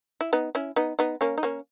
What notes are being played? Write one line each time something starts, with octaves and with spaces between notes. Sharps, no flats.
E4
B3 D#4
C#4 E4
B3 D#4
B3 D#4
A#3 C#4
D#4
A#3 C#4